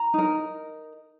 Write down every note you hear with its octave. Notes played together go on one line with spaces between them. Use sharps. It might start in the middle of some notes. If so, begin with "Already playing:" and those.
Already playing: A#5
D#4 A#4